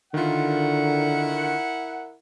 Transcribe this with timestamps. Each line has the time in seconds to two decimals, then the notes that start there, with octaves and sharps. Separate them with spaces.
0.14 D3 D#3 E4 F4 A#4 F#5